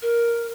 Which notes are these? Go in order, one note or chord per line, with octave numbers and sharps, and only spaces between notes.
A#4